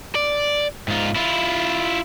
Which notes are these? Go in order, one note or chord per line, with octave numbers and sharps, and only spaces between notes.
D5
G#2 F4
E4 F4